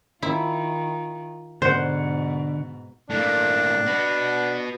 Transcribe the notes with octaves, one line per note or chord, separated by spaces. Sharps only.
D#3 E4 F4
G#2 B2 D3 C5 F#5
A2 A#3 D4
F#4 B4